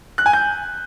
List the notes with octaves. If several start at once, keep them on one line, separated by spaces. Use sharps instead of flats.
F#6
G#5
G6